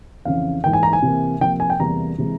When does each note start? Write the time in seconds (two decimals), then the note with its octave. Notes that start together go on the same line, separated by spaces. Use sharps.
0.25 F2 C#3 E3 F5
0.64 G#2 E3 A#3 G5
0.73 G#5
0.83 A#5
0.93 G#5
1.02 C3 E3 A#3
1.41 C3 F3 A#3 G5
1.60 G#5
1.70 G5
1.79 E2 C3 E3 G3 A#3 A#5
2.18 C3 E3 G#3